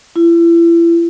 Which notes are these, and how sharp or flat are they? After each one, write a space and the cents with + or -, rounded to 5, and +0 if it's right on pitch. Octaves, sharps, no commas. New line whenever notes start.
E4 +35